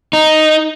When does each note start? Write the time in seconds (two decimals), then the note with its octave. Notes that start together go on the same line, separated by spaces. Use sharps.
0.13 D#4